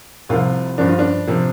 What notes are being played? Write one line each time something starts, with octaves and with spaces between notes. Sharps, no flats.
C2 C3 F3 F4
G2 F3 D4
F4
D4
C3 F3